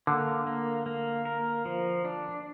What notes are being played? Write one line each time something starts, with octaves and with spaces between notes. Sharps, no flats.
D3 A#3
A#3
A#3
A#4
F3
D4